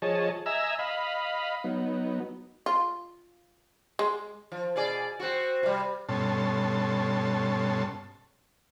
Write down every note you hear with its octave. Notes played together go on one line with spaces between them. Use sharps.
F3 G#4 C#5 D#5 A5
D#5 E5 G#5 A#5 E6
D#5 F5 B5
F#3 B3 D#4
F4
G#3
F3
B2 G#4 D5
C4 F#4
C3 G3
G2 B2 C#4 A4 A5 C6